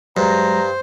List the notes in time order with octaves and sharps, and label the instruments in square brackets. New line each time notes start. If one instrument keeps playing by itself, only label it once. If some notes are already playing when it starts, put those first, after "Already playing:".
[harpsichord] G2 [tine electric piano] F#3 G#3 [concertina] C5 [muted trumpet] A#5